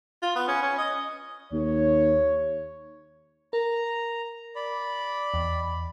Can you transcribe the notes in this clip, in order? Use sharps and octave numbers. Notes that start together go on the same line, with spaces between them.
F4
B3
C#4
C#4
D#5
D#2 C#5
A#4 A#5
D5 B5
E2